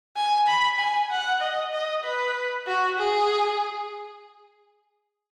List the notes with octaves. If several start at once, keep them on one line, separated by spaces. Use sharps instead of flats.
G#5
B5
G#5
F#5
D#5
D#5
B4
F#4
G#4